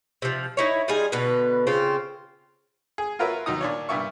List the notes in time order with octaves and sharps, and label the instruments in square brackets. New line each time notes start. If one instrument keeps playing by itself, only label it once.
[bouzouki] C3 F3
D#4 E4 C#5
G3 D#4 F4 G#4
B2 D3 B4
C#3 C4 F4
[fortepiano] G#4
F4 F#4 A#4 B4 C#5 E5
D#2 F#3 D#4 D#6
A#2 D4 C#5
G2 A#2 E5 C#6